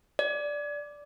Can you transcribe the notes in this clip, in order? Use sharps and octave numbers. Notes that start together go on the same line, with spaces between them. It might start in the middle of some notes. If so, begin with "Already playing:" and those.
D5